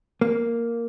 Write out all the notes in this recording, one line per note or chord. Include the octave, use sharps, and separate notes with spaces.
A#3